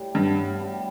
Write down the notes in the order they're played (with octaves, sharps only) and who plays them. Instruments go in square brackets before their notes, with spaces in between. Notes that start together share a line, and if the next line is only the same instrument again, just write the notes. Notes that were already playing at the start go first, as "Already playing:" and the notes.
Already playing: [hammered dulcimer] A2 G3
[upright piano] G2 [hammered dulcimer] B3
[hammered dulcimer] A2
G3